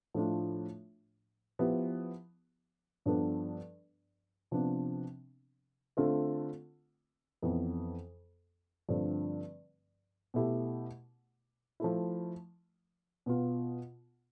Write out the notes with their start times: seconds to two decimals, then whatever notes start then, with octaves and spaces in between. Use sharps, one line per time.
0.14 A2 F3 A3 D4 F4
1.59 F3 B3 E4 G4
3.06 G2 F3 B3 D4 A4
4.51 C3 F3 B3 D4
5.97 D3 A3 C4 F4 A4
7.42 F2 E3 B3
8.88 G2 D3 F3 A3 C4
10.34 B2 A3 E4 G4
11.80 F3 A3 E4
13.26 B2 B3 F4